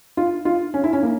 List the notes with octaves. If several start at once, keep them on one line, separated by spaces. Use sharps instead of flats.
F4
F4
C#4
E4
C#4
A#3